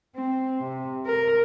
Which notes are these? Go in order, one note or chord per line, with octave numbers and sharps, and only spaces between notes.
C4
C3
A#4